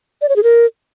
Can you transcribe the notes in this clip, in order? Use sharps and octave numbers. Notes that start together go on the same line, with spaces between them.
D5
C#5
G#4
A#4